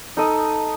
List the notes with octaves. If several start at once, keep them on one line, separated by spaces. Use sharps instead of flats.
D#4 A4 D#5